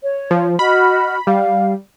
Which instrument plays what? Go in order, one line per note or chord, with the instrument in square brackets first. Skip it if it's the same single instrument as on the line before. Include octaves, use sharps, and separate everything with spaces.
[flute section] C#5
[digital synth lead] F3
[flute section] F#4 D#5 F6 [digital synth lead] B5
[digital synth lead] G3 [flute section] F5